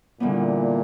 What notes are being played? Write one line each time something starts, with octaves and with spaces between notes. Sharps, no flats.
E2 A#2 D3 G3 B3